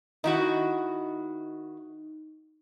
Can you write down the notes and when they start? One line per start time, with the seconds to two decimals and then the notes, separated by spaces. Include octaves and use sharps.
0.24 D#3 D#4 E4 F#4